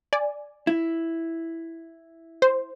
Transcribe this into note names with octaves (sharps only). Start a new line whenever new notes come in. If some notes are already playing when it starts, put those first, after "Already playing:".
D5 G#5
E4
C5